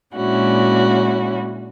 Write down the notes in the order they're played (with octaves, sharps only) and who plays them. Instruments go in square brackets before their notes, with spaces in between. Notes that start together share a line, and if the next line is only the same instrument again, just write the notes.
[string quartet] A#2 G#3 C#4 D4 E4 F#4